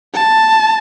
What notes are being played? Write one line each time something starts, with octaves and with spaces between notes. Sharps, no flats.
A5